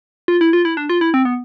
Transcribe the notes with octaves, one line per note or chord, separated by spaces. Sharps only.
F4
E4
F4
E4
D4
F4
E4
C4
B3